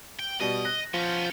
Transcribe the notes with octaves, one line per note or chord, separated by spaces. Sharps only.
G5
B2 G3 D#5
F#6 A#6
F3 B3 C#4 F4 G6